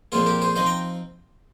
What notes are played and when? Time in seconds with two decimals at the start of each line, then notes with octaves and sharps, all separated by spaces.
0.12 A#2 F3 G#3 C4 F4 G#4
0.26 G4 A#4
0.42 G#4 C5
0.56 F3 C4 D#4 C5 D#5
0.66 G5 A#5